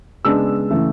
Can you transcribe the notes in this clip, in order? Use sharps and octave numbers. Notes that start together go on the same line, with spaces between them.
C#3 G#3 B3 D4 E6
C#3 E3 A3